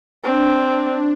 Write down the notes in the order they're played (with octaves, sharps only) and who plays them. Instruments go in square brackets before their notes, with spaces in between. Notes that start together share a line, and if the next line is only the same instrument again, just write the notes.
[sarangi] C4 [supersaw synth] D4